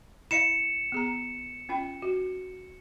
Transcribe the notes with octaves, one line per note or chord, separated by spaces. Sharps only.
E4 D#5 F5 C#7 E7
B3 G#4 A#5
C#4 F4 G5
F#4